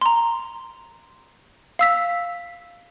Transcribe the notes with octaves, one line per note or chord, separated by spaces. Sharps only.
A#5 C6
F5 E6 B6